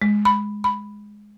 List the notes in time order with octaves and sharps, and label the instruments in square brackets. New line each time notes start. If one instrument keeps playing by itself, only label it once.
[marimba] G#3
B5
B5